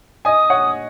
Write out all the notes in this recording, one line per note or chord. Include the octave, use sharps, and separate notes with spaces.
D#5 G#5 D#6
C#5 F#5